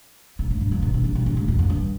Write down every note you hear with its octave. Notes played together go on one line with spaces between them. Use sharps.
C3
A2
G2
F2
B2
C3
E3
C3
C3
A2
F2
F2
G2